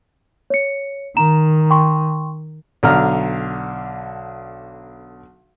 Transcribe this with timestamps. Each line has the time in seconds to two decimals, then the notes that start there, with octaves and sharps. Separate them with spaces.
0.50 C#5 C#7
1.17 D#3 A#5 E7
1.70 G5 C6 C#6
2.83 B1 D3 A#5 F6